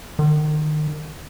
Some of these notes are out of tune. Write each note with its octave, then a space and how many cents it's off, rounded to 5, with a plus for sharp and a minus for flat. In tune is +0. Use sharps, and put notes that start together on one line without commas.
D#3 -35